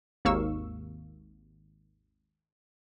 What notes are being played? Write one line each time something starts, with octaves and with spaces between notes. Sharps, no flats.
G#1 D#2 A#3 F5 C#6 E6